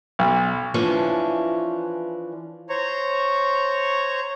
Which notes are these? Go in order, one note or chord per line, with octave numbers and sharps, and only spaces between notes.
B1
E3 F3 C#4 D4
C5 C#5 A#5 C#6